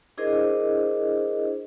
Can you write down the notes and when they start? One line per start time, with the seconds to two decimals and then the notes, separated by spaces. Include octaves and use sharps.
0.18 D4 E4 G#4 A#4 C5 D#5